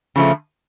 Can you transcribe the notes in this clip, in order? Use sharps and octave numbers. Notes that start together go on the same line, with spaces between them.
C#3 F3 A3